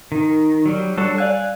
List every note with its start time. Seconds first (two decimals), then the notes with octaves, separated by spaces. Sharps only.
0.12 D#3
0.66 F#3 G3
0.98 G3 D4 F#4 A4 C#5
1.18 D5 F5 G#5 F#6